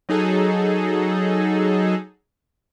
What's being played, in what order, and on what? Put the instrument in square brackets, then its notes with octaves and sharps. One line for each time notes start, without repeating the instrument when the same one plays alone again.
[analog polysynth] F#3 D#4 G#4 A4